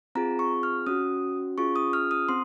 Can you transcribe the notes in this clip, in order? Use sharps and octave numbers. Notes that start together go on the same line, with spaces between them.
C4 F4 G#4 A#5
C#6
F6
C#4 F#4 D#6
C#4 F4 G#4 C#6
D#6
F6
D#6
C4 C6